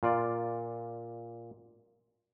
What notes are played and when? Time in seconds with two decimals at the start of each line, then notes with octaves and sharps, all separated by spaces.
0.03 A#2 F4 D5